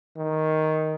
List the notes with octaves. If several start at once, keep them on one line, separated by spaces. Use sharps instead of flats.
D#3